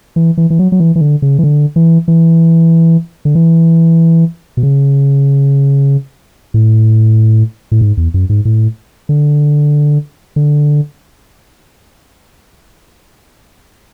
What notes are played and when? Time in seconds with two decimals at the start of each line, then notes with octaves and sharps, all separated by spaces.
0.16 E3
0.37 E3
0.50 E3
0.59 F#3
0.72 F#3
0.80 E3
0.96 E3
1.01 D3
1.22 C#3
1.39 E3
1.44 D3
1.76 E3
2.08 E3
3.25 D3
3.35 E3
4.57 B2
4.63 C#3
6.54 A2
7.72 A2
7.81 G#2
7.97 E2
8.14 F#2
8.29 G#2
8.45 A2
9.09 D3
10.36 D3